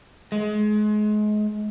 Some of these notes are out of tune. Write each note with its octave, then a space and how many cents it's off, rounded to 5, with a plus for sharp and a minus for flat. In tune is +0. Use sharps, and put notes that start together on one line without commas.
G#3 +30